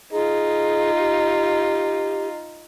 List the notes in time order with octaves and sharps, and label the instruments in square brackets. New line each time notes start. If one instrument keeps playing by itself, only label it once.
[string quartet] D#4 F4 [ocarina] G#4
[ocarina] G4